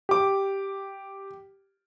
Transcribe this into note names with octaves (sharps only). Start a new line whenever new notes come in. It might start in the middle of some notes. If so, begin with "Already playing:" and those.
G4 D6